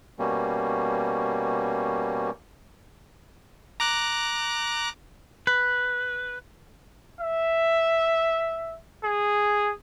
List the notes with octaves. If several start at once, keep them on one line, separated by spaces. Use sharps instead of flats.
B2 G3 A#3 C#4
A#5 D6 F#6
B4
E5
G#4